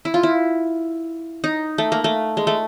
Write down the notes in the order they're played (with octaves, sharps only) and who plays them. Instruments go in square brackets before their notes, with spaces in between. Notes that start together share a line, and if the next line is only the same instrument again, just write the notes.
[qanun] E4
F4
E4
D#4
A3
A#3
A3
G#3
A3